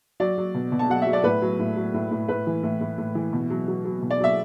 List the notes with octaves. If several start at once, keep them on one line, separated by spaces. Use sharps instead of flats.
F#3 D5
F#3
B2
B2
A5
F#3 F#5
F#3 E5
D5
A2 B4
F#3
A2
F#3
A2
A2
A2 B4
E3
A2
A2
A2
E3
B2
F#3
F#3
F#3
B2
D5
F#3 E5